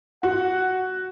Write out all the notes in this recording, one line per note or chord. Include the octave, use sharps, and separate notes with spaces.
F#4 F#5